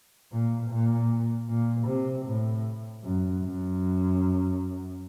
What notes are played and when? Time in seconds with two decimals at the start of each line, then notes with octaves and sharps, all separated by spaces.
0.31 A#2
0.70 A#2
1.48 A#2
1.87 C3
2.25 A2
3.04 F#2
3.44 F#2